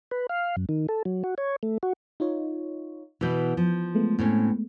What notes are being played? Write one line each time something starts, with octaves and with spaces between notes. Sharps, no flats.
B4
F5
F#2
D#3
A4
F#3
F#4
C#5
A3
F#4
D#4 F4 C#5
B2 E3 B4 G6
F3
G#3 A3 B3
A2 C4 C#4